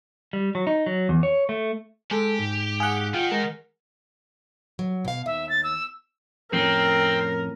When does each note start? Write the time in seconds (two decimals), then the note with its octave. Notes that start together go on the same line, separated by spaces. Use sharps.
0.33 G3
0.55 F#3
0.67 D#4
0.86 F#3
1.09 E2
1.23 C#5
1.49 A3
2.11 G#3 G4 A4
2.39 G#2
2.80 G#4 F5 F#5
3.14 D#3 F4 G5
3.32 G#3 A#4
4.79 F#3
5.05 B2 F5
5.26 D#2 E5
5.50 A6
5.64 E6
6.53 F2 A2 C4 C#4 A#4